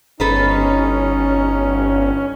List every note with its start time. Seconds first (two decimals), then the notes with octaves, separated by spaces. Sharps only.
0.20 G1 C#4 D#4 A4 B4 C5